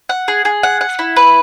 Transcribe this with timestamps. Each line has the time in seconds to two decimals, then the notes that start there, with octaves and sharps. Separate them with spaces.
0.09 F#5
0.28 G#4
0.45 G#4
0.63 F#5
0.81 F#5
0.99 E4
1.16 B4